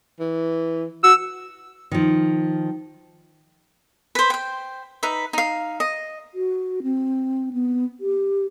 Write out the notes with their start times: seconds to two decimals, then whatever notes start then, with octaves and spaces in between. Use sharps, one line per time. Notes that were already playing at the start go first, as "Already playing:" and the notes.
0.20 E3
1.04 F#4 E6
1.91 D#3 F3
4.15 B4 C5
4.30 C5 G5
5.03 D#4 B4 E5
5.33 D#4 F5
5.80 D#5
6.34 F#4
6.83 C4
7.53 B3
8.01 G4